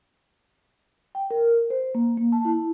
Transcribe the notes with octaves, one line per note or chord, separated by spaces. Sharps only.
G5
A#4
C5
A#3
A#3
A5
E4